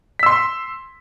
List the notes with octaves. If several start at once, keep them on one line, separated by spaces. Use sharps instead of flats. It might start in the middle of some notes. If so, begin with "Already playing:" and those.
C6 E6 B6